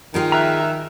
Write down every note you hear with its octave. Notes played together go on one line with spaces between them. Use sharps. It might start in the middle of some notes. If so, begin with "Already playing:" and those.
D#3 F4 G#4 G5
E5 A#5 F6 F#6